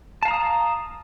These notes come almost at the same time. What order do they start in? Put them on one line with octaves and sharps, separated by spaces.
A5 F5 A#5 D#6